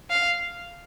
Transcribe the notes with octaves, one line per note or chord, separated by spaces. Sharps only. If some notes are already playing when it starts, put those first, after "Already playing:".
F5